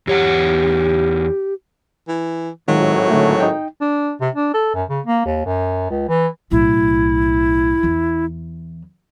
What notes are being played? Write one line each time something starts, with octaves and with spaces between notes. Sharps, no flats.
E2 G4 C#5 F#5
E3
G#1 A2 D#3 F#3 G#3 F4
D3 A3
D#4 G5
D4
C3
D4
A4
F#2
C#3
A#3
D#2
F#2
C#2
E3
B1 A2 E4
E2 E3